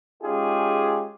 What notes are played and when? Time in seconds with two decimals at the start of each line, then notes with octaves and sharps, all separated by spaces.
0.23 G#3 C#4 D#4 F4 G4 G#4